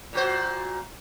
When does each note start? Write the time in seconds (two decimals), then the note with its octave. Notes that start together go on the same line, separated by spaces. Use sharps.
0.13 A#2 F#4 C5